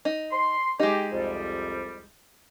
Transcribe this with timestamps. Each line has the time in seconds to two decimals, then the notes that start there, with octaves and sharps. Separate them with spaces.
0.05 D#4
0.32 C6
0.80 G#3 D#4 G4
1.12 C2 F2 G3